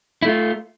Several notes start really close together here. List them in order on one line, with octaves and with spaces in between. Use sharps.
E4 A3 F4